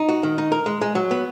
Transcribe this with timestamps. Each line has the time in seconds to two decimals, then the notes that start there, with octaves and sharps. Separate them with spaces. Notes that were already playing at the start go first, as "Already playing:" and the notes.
Already playing: D#4
0.09 F#4
0.23 D#3
0.38 D#4
0.52 A#4
0.66 G#3
0.81 G#3
0.95 F#3
1.11 B3